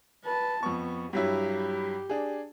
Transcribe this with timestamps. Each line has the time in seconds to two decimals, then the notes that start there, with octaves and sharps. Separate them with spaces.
0.24 B4 A5
0.63 F2 B3 C#6
1.13 G2 F#3 E4 G4
2.09 D4 G#4